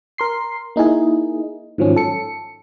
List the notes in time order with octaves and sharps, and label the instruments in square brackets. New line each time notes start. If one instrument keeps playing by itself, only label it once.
[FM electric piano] A#4 C6 C7
A#3 D#4 E4 G#4
G#2 D#3 F3 F#3 C#4
A4 C#7